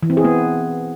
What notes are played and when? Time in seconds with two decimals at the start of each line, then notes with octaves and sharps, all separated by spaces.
0.03 E3
0.10 C4
0.17 G#4
0.24 B3